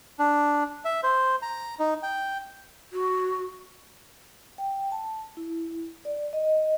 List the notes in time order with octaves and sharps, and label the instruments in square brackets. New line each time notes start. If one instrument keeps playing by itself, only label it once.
[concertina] D4
E5
C5
A#5
D#4
G5
[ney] F#4
[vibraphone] G5
A5
E4
D5
D#5